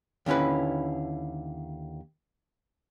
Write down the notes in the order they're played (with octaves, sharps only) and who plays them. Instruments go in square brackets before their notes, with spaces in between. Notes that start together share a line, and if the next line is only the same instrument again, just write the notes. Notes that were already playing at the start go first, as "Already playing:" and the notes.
[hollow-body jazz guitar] D#2 D3 C#4 E4 B4